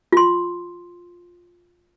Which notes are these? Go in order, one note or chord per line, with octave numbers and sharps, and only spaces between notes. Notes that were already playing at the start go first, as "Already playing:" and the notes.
F4 C6